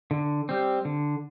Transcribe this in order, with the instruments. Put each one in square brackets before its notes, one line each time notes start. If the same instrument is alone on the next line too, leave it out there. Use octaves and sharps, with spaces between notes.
[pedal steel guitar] D3
G3 C4
D3